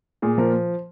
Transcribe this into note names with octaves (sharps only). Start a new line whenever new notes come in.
A#2 G#4
F3 A#4